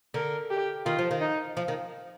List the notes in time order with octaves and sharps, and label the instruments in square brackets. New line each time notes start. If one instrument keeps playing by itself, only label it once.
[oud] D3 [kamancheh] A#4
[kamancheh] G4
[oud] D#3 [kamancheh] F4
[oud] F3
D#3
[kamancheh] D#4
[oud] F3
D#3